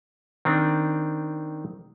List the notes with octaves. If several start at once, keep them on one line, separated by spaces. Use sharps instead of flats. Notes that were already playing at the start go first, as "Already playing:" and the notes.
D#3 C4 D4